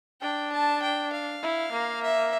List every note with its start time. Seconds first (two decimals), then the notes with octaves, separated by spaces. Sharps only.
0.21 D4 G5
0.52 A5
0.82 G5
1.12 F5
1.42 E4
1.72 A#3
2.02 E5